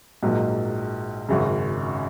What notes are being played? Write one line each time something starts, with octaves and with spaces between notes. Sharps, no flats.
A#1 G#2 F#3 A#3 D#4
G#1 F#2 C#3